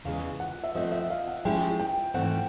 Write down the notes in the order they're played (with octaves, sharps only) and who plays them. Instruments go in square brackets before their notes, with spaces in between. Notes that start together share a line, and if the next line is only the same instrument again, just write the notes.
[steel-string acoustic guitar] E2 C#3 E3 G#3 [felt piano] F5
[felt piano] F#5
E5
[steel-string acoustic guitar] F3 A3 C4 [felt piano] D#5
[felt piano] E5
F5
F#5
[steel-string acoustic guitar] F3 G#3 C#4 E4 G4 [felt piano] G5
[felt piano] G5
[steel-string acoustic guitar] G#2 E3 A3 C4 [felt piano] F#5